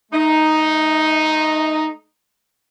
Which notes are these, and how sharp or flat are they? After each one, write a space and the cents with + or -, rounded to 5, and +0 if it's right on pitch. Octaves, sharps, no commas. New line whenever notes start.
A3 -35 D#4 +0